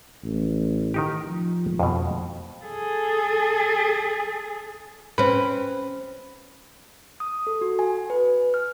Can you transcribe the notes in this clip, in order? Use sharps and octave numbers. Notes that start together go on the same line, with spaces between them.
A1
D#3 D#4 G4
F3
F2 B2
G#4 A4
C4 C#4 B4
D#6
A4
F#4
G#5
B4
F6